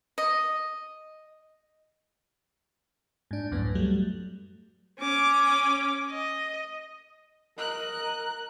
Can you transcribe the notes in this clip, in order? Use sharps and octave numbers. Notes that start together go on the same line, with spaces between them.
D#5
G#2 D4
C#2 F#2 A2 B3
F#3 G3 A3
C#4 D6
D#5
A#4 D#5 F#6